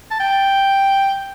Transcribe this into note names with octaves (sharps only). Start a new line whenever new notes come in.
A5
G5